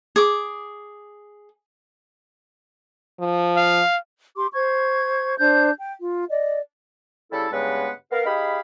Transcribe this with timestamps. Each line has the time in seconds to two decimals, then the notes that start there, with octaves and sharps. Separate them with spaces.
0.16 G#4 D6
3.20 F3
3.57 F5
4.37 G4 C6 D6
4.53 C5 C#6 G#6
5.38 D4 C5 G6
5.79 G5
6.00 F4
6.29 D5 D#5
7.32 C#3 G3 E4 A4
7.52 G2 C#3 G#3 B3 B4 F#5
8.12 B3 A#4 F5
8.26 D#4 G4 G#4 F5 B5